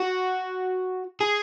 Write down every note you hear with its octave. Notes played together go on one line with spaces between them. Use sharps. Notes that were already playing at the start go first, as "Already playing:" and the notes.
Already playing: F#4
G#4